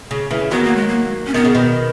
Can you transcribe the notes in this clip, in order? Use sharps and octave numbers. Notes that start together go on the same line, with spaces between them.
C#3
C#3 E3
D#3 F#3 B3
A#3
G#3
A#3
C#4
D#3 B3
C#3
B2 D#3